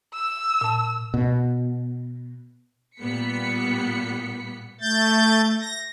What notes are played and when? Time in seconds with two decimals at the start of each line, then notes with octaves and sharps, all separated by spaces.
0.14 E6
0.61 A#2 A5
1.14 B2
2.99 A#2 G3 B3 B6 C#7
4.81 A3 G6 A6
5.60 A#6